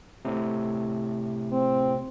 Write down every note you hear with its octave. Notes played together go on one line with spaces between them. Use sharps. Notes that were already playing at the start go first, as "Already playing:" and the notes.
A2 C3
C4